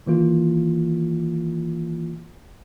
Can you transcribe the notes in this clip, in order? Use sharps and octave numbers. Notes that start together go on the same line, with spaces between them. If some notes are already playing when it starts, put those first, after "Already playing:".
D#3 E3 A#3 F4